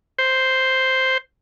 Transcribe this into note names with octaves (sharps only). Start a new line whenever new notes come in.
C5